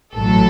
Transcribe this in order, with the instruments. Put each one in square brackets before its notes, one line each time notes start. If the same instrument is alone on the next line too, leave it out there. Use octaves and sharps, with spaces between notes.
[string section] A1 A2 F#3 A4